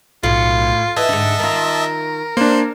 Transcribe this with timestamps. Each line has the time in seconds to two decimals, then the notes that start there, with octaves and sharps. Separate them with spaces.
0.23 B1 A2 F4
0.96 E3 D#5 E5 A5
1.09 G#2 D3
1.39 D#3 F4 A#4
2.37 A#3 D4 C5